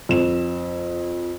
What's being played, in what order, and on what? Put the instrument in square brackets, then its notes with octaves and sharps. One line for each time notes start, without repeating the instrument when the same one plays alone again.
[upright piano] F2 E7